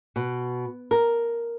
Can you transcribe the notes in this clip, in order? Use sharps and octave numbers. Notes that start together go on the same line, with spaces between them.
B2
A#4